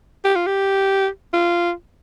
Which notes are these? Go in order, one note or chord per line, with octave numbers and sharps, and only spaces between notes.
G4
F4
G4
F4